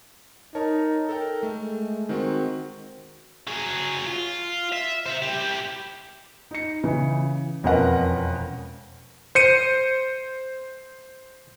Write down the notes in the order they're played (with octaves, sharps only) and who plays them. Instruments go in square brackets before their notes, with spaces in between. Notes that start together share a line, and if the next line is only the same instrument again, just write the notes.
[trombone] D#4 [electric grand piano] A#4 C#5 A5
[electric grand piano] A4 A#4 G5
[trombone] G#3 [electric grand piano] A3
[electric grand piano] D#3 C4 F#4
[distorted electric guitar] F#3 G#4
F4
E5
C5 E5
E4 G4
[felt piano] D#4 C#7
C#3 E3
E1 F2 C#4 A#4 B4 F#5
[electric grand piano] C5 C#7 D#7